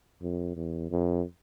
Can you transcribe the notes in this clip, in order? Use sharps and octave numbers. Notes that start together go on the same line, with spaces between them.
F2
E2
F2